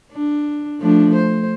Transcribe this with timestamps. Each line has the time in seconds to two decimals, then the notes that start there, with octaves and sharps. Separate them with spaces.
0.12 D4
0.80 F3 A3 D4
1.15 C5